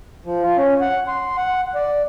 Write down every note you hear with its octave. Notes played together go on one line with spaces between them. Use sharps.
F3
F4
C#4
F#5
C6
F#5
D5